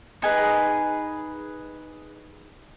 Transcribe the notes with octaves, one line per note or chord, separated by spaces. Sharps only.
D#4 G#4 B4